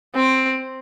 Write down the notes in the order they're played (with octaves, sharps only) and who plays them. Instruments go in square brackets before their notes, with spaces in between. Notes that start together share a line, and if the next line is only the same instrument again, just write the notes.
[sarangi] C4